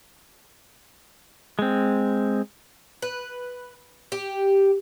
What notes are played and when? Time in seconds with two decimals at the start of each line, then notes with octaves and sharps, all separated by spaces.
1.59 G#3 C4
3.02 B4
4.12 G4